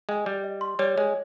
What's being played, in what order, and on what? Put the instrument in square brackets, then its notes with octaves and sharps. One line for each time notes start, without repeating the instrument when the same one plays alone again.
[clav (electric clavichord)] G#3 [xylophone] G5
[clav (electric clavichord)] G3 [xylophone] G6
[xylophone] D#5
C6
[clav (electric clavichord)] G3 [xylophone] C#5
[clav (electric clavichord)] G#3 [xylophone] C#5